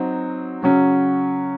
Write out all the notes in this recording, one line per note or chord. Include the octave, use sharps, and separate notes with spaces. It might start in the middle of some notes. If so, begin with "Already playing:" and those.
Already playing: F#3 C4 D#4
C#3 F#3 C#4